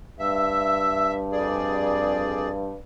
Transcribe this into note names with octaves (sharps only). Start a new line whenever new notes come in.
G2 E5
F2 G#4 D5